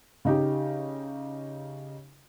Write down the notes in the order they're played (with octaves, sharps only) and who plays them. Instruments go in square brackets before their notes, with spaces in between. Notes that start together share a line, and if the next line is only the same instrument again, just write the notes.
[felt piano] C#3 D#4 G4